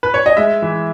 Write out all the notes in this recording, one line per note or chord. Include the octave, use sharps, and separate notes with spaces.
B4
C#5
D#5
G#3 E5
E3